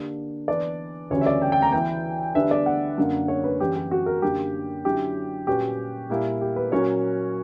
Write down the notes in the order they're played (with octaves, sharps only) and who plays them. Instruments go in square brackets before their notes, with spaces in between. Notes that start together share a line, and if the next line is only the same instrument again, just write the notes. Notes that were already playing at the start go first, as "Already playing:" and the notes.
Already playing: [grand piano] D3 A#3 D4 G4
[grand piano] E3 B3 D4 [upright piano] D5
[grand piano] D2 C#3 E3 G3 C#4 [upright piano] C#5
[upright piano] E5
D5
G5
G5
A#5
[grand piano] E3 B3 E4 [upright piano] G5
[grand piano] D3 G3 B3 D4 [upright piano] E5
[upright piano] D5
F#5
[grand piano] F#2 D3 A#3
[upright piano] C#5
B4
[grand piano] F#2 E3 G3 C#4 [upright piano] G4
[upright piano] G4
F#4
A#4
[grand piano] F#2 D3 A#3 [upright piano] G4
[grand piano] D3 F#3 C#4 E4 [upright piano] G4
[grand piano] A#2 G3 C#4 F#4 B4 [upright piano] G4
[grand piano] A#2 G3 A#3 E4
[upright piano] G4
B4
[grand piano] A#2 F#3 C#4 F#4 A#4 [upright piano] C#5